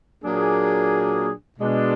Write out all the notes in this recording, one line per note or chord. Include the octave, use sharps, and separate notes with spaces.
A#2 F#3 A#3 D4 G#4
B2 G#3 D4